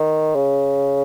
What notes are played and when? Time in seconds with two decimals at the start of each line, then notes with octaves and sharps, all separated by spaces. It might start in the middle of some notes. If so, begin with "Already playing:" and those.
Already playing: D#3
0.36 C#3